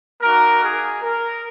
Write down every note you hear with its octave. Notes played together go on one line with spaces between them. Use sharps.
A#3 D#4 F#4 A#4
G#4
A#4